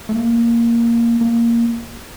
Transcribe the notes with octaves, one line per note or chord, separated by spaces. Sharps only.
A3
A#3
A#3